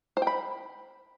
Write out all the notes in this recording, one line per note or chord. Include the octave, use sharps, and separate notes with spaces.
C5
G5
B5